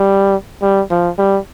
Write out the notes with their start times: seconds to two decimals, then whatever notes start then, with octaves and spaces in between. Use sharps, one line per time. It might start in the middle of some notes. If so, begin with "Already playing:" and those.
Already playing: G3
0.62 G3
0.90 F3
1.19 G3